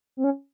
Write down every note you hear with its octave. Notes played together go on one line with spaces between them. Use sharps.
C4
C#4